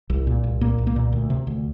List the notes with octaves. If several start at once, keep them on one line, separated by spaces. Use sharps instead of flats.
C2
A#2
C2
A#2 A#3
C2
A#3
A#2
D2
C3
D2